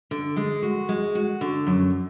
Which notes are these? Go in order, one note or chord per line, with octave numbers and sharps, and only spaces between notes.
D3
G#3
F#4
G#3
F#4
D3
F#2